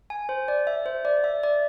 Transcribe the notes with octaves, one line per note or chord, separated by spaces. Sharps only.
G#5
C5
D5
E5
C5
D5
E5
D5